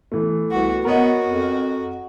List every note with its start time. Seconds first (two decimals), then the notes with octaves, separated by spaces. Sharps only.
0.12 E3 A3
0.51 C2 B3 F#4
0.85 B3 F#4 A#4 C#5 D#5
1.26 F2